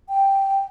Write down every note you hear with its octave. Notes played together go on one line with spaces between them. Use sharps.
G5